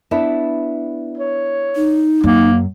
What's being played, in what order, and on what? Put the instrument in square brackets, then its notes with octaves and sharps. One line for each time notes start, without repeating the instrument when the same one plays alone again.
[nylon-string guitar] B3 D4 E4
[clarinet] C#5
[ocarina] D#4
[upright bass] F#2 [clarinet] A#3